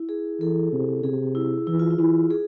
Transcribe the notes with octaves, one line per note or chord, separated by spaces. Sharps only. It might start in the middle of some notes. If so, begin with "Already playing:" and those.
Already playing: E4
G#4
E3 A4
C3
C3 G#4
E4
E3 E4
F4
E4
E3
G#4